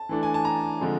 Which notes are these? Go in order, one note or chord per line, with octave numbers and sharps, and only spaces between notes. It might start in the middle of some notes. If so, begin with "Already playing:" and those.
Already playing: A5
E3 A3 D4
G#5
A5
A#5
D3 F3 G#3 C4